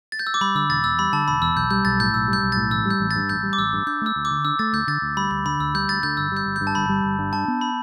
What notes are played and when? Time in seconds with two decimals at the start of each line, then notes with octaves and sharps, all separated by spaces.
0.12 A6
0.19 G6
0.27 E6
0.34 D6
0.41 G3 B5
0.55 D3 E6
0.69 E1 A6
0.84 E2 E6
0.99 G3 B5
1.13 D3 A5
1.28 E1 B5
1.41 E2 E6
1.56 B1 G6
1.71 G3 G6
1.85 B1 A6
2.00 A2 G6
2.14 B1 E6
2.28 G3
2.33 G6
2.43 B1
2.52 A2 A6
2.71 A1 E6
2.85 G3
2.90 G6
3.00 A1
3.11 G2 A6
3.29 A1 G6
3.43 G3
3.53 D6
3.58 A1 E6
3.73 G2
3.87 D4 G6
4.01 A3 E6
4.16 D2
4.25 D6
4.30 D3
4.45 D4 E6
4.59 A3 A6
4.73 D2 G6
4.87 D3 A6
5.02 D2
5.17 G3 B5
5.31 D2 B5
5.45 D3 B5
5.59 D2 E6
5.74 G3 G6
5.89 D2 A6
6.03 D3 G6
6.17 G1 E6
6.32 G3 G6
6.46 G1
6.56 G6
6.61 G2
6.67 A5
6.75 G1 B5
6.89 G3
7.04 G1
7.19 G2
7.33 D4 A5
7.48 B3
7.61 B5